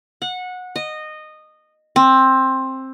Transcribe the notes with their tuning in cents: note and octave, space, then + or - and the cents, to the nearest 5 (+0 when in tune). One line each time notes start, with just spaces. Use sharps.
F#5 -20
D#5 -15
C4 +15